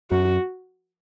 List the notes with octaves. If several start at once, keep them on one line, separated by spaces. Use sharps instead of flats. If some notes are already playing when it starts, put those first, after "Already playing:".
F#2 F#4